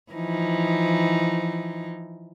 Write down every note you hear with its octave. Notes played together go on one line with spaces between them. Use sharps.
E3 F3 D#4